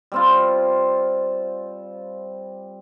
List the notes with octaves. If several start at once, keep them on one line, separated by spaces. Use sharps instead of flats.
G3 C4 F4